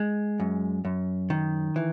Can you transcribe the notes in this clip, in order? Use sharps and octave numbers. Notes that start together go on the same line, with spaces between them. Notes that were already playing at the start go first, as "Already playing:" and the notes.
Already playing: G#3
F#2
F#2
D#3
E3